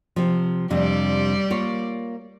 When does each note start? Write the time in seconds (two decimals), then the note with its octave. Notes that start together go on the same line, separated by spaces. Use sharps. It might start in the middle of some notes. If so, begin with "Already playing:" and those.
0.16 C3 F3
0.70 F2 C3 G3 D4 D5
1.50 A#3 F4 C#5